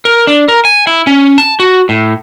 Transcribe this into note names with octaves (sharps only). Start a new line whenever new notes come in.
A#4
D4
A#4
G#5
E4
C#4
A5
F#4
A2